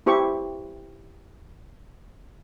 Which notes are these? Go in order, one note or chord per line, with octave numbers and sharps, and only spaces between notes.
E4 G4 C5 C#6